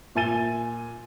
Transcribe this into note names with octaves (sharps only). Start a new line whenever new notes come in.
A#2 E5 G#5 A6 D#7 G7